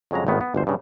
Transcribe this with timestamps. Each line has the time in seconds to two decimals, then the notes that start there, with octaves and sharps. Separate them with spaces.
0.11 F2 C#3 F#3 G#3 A#5
0.27 G#1 A2 D#3 B3
0.41 B3
0.54 G1 D2 C5
0.67 G2 C#3